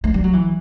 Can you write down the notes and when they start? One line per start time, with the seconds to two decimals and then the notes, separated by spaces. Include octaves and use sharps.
0.04 A3
0.14 G3
0.24 F#3
0.33 E3